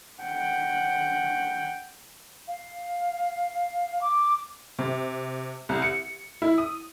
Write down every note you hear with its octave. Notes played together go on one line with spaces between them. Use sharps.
F#5 G5
F5
D6
C3
C2
C#7
E4
D#6